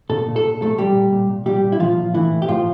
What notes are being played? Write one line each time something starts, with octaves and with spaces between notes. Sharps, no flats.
A#2 A4
A#2
A4
A#2
A#2 A3 A4
A#2 G3 G4
A#2
A#2
A#2
A#2 G3 G4
A#2
E4
A#2 F3 F4
A#2
A2 E3 E4
A2
G4
A2 F3 F4